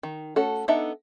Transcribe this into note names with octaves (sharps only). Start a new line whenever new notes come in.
D#3
A3 C#4 F#4 A4
B3 D4 D#4 A4 E5